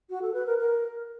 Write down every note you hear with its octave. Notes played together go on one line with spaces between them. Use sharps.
F#4
A4
B4
A#4
A#4